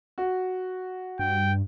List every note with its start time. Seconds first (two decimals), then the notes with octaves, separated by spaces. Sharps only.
0.18 F#4
1.19 G2 G5